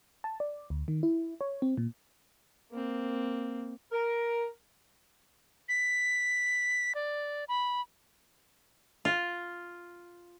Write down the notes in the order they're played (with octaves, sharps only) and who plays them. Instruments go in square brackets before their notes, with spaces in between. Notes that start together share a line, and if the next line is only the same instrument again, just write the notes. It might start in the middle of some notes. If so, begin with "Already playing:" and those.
[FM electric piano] A5
D5
D2
D#3
E4
C#5
C4
A#2
[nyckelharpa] A#3 C4
[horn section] A#4
[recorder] B6
D5
B5
[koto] F4